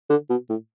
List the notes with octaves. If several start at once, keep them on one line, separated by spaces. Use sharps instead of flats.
D3
B2
A2